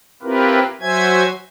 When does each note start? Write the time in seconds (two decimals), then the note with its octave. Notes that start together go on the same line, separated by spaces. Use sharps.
0.23 C4 E4 F4 G4 A#4 B4
0.81 F#3 F#4 C5 E5 G#5 G#6